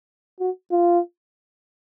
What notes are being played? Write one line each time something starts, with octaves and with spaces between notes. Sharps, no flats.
F#4
F4